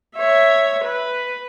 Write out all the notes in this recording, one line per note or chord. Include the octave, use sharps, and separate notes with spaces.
C#5 E5
B4